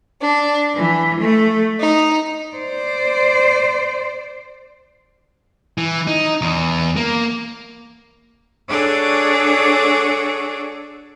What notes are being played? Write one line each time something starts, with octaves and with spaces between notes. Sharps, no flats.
D4
E3
A3
D#4
C5 D5
E3
D#4
E2
A#3
D4 F#4 G#4 A4 C#5 D5